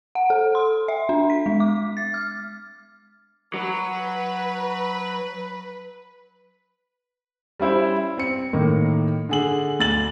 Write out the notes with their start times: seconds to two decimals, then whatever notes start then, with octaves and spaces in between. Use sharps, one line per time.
0.15 F#5
0.30 A4
0.55 C6
0.88 E5
1.09 D4
1.30 B6
1.46 G#3
1.60 D6
1.97 A6
2.14 F6
3.54 F#3 B4
7.59 G3 C#4 E4 C5
8.18 C4 C#7
8.53 A2 D#3 A#3
9.29 D3 G#4 F#7
9.80 D2 A6 F#7